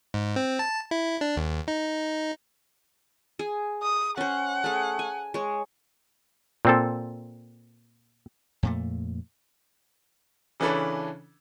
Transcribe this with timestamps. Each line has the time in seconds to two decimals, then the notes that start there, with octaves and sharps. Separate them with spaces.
0.14 G#2
0.36 C4
0.59 A5
0.91 E4
1.21 D4
1.37 D#2
1.68 D#4
3.39 G#4
3.83 D#6
4.17 C#4 C5 F#5
4.64 A3 G#4
4.99 G#5
5.34 G#3 C#5
6.65 A#2 C4 A4
8.63 F2 A#2 A3
10.60 C#3 E3 C#4 D4 A4 B4